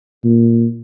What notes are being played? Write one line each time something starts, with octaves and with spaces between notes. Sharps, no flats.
A#2